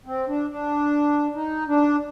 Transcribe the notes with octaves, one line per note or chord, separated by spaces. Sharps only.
C4
D4
D4
D#4
D4